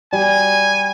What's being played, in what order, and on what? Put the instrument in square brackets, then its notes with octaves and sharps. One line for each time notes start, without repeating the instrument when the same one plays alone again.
[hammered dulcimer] G3 [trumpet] G#5